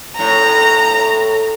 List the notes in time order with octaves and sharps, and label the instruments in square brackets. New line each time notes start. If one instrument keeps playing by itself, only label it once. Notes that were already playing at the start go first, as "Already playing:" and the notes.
[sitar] A2 [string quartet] A#5